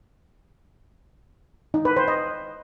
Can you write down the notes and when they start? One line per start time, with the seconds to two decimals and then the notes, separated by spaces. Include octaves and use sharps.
1.74 D#4
1.85 B4
1.96 C5
2.08 D#5